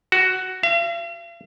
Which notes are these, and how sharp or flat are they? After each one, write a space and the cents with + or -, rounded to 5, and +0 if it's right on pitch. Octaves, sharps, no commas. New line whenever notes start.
F#4 +10
F5 -45